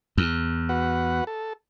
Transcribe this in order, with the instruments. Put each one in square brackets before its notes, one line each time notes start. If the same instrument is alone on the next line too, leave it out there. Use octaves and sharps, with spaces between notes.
[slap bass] E2
[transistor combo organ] F#4 B4 F#5
A4